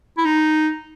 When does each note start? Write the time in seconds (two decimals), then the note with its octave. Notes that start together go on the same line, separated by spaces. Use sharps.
0.17 E4
0.25 D#4